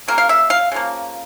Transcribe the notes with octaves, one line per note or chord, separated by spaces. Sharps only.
C#3 F#3 A#3 A#4
F5
E5
F5
C#3 F3 A#3